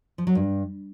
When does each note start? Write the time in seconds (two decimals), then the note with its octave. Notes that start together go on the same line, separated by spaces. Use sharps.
0.18 F3
0.27 F#3
0.35 G2